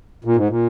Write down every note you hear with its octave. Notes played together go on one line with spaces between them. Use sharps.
A#2
G#2
A#2